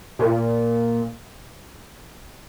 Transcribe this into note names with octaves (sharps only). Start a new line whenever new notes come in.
A#2